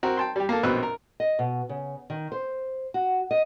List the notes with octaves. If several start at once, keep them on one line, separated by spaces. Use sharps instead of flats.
C4 F#4 A#4
G5 A5 C6
G3 G4
A#3 A4
A#1 B2 C4 B4 E6 F#6
A#4
D#5
B2
C#3
D#3
C5
F#4
D#5